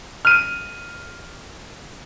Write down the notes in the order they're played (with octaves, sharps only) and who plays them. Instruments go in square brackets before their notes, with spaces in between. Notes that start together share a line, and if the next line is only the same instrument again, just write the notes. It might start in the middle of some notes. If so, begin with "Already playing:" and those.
[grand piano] F6 D#7